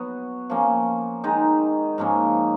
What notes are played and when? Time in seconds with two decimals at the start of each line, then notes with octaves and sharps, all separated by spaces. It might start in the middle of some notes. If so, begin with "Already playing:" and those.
Already playing: F#3 B3 F#4
0.50 F3 A#3 C#4
1.24 D#3 G#3 D#4
1.98 G#2 F3 A#3 C#4